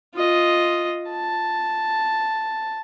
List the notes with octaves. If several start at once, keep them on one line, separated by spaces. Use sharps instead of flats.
F4 D#5
A5